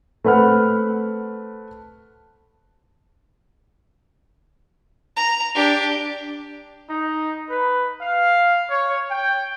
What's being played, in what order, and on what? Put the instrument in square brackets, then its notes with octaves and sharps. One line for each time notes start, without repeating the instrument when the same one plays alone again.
[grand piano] A3 C4 B4 F#5 F6
[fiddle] A#5
D4 G4
[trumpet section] D#4
B4
F5
C#5
G5